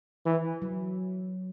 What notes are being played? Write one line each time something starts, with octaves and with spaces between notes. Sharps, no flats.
E3
F#3